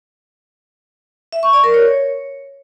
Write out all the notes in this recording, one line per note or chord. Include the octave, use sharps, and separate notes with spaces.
E5
C#6
D5
A#4
C#5